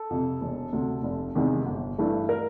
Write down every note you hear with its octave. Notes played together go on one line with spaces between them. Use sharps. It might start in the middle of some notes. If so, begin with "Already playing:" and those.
Already playing: A4
F2 C3
E1
D2 C3
F1
E2 C3 D#3 G#3
G1
G2 E3 A3
A#4